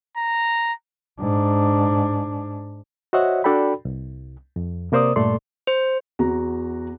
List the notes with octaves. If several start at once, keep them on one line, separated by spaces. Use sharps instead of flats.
A#5
G#2 D4
F#4 C5 C#5 D#5 E5 F#5
D4 F#4 A4 D5 G5 B5
C2
F2
C3 A#3 A#4 C5 D5 D#6
G2 A#2 A3 A4 D5 C6
C5
E2 F#4 A#5